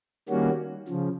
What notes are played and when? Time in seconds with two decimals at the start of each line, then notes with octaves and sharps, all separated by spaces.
0.29 D#3 G3 A#3 C#4 F#4
0.88 C#3 F3